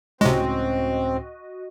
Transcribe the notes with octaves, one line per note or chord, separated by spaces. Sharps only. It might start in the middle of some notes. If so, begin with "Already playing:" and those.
C#2 A2 C3 G#3 C4 C#4 F#4 D#5